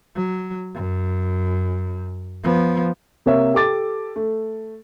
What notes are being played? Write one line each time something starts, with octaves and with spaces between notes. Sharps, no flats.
F#3
F#2
F3 B3
C3 A#3 C#5 E5
G4 A4 D6 A6
A3